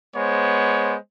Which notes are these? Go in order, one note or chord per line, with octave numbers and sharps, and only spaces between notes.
G#3 B3 C5 C#5